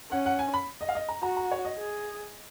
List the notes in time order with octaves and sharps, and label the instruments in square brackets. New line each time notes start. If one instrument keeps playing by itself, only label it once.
[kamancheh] C#4 [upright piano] F#5
[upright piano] F#5
G#5
B5
D#5
F5
D#5
A#5
[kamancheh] F#4 [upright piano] A#5
[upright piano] A#5
C#5
D#5
[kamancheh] G#4